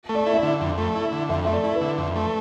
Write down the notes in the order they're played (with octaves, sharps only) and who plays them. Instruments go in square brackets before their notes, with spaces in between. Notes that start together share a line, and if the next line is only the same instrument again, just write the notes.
[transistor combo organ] A3
[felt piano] D5
[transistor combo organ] E4
[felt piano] E5
[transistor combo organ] D3 [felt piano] D5
[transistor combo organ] F2
A3
E4
D3
[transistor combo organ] F2 [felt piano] E5
[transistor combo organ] A3 [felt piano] E5
[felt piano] D5
[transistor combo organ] E4
[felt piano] B4
[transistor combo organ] D3
F2
A3